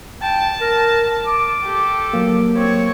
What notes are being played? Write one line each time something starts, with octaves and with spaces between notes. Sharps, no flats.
G5 A5
A#4
D6
G4 A4
F#3 A#3
C4 C#5